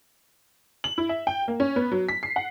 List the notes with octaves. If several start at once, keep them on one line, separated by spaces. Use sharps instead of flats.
F#7
E4
E5
G5
A#3
C#4
B3
F#3
B6
C7
F#5